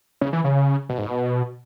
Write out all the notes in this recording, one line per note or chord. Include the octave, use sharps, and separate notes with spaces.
C#3
E3
C#3
B2
G#2
B2